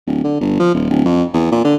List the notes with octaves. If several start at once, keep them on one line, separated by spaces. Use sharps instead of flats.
D1
D3
G1
F3
D#1
D1
F2
E2
A#2
D3